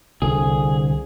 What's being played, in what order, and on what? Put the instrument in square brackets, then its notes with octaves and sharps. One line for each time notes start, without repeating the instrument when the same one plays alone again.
[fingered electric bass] C2 [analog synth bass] D3 [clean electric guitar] G#4